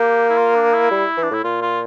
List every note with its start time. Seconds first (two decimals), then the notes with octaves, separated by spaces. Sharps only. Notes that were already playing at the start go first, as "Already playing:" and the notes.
Already playing: A#3 G4
0.29 E4
0.38 F4
0.55 D4
0.73 E4
0.91 G3
1.17 E3
1.23 D4
1.31 A2 E4
1.44 A#2 F4
1.62 F4